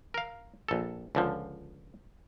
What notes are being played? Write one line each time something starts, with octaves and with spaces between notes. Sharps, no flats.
A#4 F5
A#1 A4
C#2 D3 F3